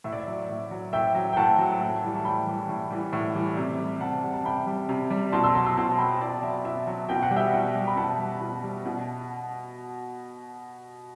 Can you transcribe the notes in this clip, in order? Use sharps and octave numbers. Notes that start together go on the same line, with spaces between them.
A2 E5
D5
E5
F#3
A2
F#3
A2 E5 G5
F#3
G5
A2 F#5 A5
F#3
A2
E3 G3
A5
A2 G5 B5
E3 G3
A2
E3 G3
A2
E3 G3
C3
G3
C3 F#5 A5
G3
A5
C3 G5 B5
G3
C3
G3
B2 A5 C6
C6 E6
F#3 A5 C6
C6 E6
B2 A5 C6
F#3 G5 B5
B2 D5
F#3 E5
B2 E5
F#3
B2 G5
F#5
G3
E5 G5
B2
G3
B5
B2 F#5 A5
G3
B2
G3
B2